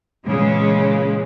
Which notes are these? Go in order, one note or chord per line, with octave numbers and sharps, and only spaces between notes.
A#2 C#3 E3 G#3